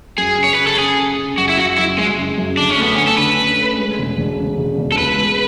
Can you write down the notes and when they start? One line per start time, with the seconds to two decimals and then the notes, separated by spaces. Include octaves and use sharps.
0.18 F#2 G#4
0.38 C#3
0.44 C#5
0.55 C#3 B4
0.67 A4
0.78 C#3 G#4
0.98 C#3
1.18 C#3
1.37 F#2 F#4
1.49 E4
1.58 F#2 F#4
1.78 F#2 E4
1.98 F#2 G#3
2.18 C#3
2.38 F#2
2.57 D3 D4
2.71 C#4
2.78 A3 B3
2.95 C#4
2.98 D3
3.07 A4
3.17 D3 B4
3.38 C#4
3.58 A3
3.78 G#3
3.98 E1
4.18 E1
4.38 C#3
4.58 E1
4.78 E1
4.92 A4
4.98 C#2 B4
5.17 G#3